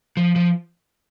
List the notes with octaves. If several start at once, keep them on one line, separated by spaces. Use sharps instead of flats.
F3
F3